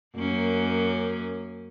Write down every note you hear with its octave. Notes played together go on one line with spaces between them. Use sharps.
F#2 A#3 C#4